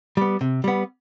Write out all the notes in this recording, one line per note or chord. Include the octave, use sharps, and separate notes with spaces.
G3 B3
C3
G3 B3